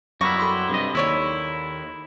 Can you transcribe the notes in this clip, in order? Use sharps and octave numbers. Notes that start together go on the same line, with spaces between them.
F#2 B2 G3 A#3 B3 E4 C#6 A#6
A4 B5 C6
G2 C3 D#5
D#2 G#3 E4 C#5 D5